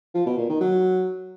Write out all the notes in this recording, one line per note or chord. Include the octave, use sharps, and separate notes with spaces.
F3
B2
A#2
D#3
F#3